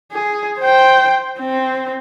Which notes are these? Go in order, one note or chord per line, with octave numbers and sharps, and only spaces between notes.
G#4
C5 G5
C4